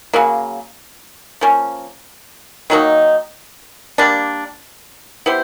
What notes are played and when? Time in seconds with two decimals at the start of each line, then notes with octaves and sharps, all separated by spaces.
0.13 C#3 F#3 A#3
1.41 F3 A#3 C#4
2.70 D#3 F#3 A#3 D#4
3.98 G3 A#3 D4
5.26 B3 E4 G4 C5